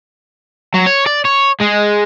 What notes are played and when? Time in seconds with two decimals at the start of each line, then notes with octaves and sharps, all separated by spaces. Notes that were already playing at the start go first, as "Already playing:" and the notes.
0.74 F#3
0.87 C#5
1.07 D5
1.25 C#5
1.60 G#3